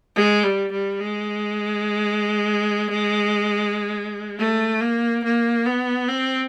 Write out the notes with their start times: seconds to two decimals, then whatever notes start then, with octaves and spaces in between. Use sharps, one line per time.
0.16 G#3
0.44 G3
0.72 G3
1.00 G#3
4.39 A3
4.81 A#3
5.24 A#3
5.66 B3
6.08 C4